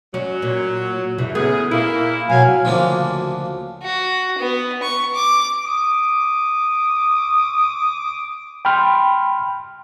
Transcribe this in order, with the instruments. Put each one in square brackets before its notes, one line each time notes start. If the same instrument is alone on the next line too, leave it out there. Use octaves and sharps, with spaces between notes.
[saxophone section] F#3 [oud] C#4
[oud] A#2
F#2 C#3 E3
[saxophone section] F#2 A2 G#4 [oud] B3
[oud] A#2 [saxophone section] A#3 E4
[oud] B2 [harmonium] F#3 F5 G#5
[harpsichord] D2 C#3 F3 F#3 A#3 D4
[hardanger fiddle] F#4
B3
C#6
D6
[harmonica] D6 D#6
[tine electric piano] G5 B5 C6 F6